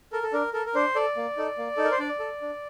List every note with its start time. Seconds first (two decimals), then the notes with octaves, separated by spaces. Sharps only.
0.13 A4 A#4
0.23 A4
0.33 D4 A#4
0.54 A4 A#4
0.66 A#4
0.75 D4 C5
0.95 A4 D5
1.17 A#3
1.37 D#4 A4
1.58 A#3
1.77 D#4 A4
1.84 A#4
1.91 C5
1.99 D4 D5
2.20 A4
2.41 D4